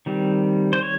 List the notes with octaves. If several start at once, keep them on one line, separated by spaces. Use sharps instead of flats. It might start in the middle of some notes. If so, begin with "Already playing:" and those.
D#3 G3 C4
C5
C#5